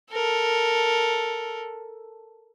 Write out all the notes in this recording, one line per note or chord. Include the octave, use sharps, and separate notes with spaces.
A4 A#4